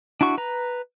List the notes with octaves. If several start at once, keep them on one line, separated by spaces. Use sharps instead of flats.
D4 E4 F#4 C#6
B4 A#5